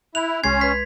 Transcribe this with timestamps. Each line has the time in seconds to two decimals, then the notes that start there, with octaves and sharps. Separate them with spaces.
0.15 E4 F#6 F7
0.44 C2 G#3 C#4 C6 G#6 C7
0.61 B4 B6 C7